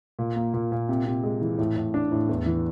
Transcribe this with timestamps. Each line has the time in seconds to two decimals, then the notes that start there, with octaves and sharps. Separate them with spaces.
0.19 A#2
0.36 A#3
0.54 A#2
0.72 A#2
0.89 C3
1.06 C3
1.24 G#3
1.42 E3
1.58 A2
1.76 A2
1.94 D4
2.12 A2
2.29 E2
2.46 E3